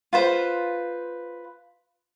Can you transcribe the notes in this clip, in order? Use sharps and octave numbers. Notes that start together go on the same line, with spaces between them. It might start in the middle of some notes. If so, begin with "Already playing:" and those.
F4 B4 C5